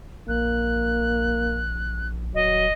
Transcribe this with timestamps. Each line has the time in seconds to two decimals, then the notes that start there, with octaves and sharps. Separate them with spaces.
0.28 A#1 A#3 F#6
2.34 D#1 F#3 D#5